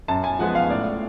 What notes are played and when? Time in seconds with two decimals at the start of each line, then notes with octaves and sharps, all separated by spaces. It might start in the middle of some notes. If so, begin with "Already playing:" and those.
0.08 F#2 A5
0.24 G#5
0.39 F3 G#3 B3 F#5
0.55 F5
0.70 A2 D5